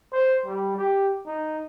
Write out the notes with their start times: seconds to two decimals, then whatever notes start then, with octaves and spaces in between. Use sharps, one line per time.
0.13 C5
0.46 G3
0.76 G4
1.26 D#4